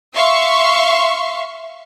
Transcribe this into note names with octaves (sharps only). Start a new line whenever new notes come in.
E5 F5 C6 C#6